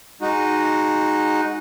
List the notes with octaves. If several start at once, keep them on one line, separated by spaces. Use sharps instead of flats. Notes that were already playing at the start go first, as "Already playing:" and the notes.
G#3 D#4 F#4